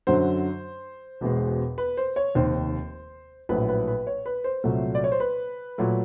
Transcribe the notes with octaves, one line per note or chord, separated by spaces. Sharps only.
F#2 D3 F#3 C5
E1 E2 B2 G#3
B4
C5
C#5
F1 D#2 D#3 C5
A#1 A2 F#3 A3 B4
B4
B4
C#5
B4
C5
C2 A#2 F#3 A3
D5
C#5
C5
B4
A#2 F#3 A3